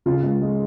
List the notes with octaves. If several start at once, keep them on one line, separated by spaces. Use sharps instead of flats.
C#3 F4
C#2
G#3